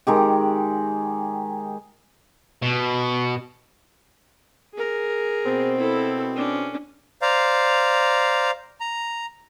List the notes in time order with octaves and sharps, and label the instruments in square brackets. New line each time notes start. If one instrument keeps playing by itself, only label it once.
[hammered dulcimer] D#3 G#3 G4
[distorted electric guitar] B2
[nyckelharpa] G#4 A#4
[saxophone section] B2 C4
[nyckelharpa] E4 A4
C#4 D4
[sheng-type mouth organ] C5 D5 F5 A#5
A#5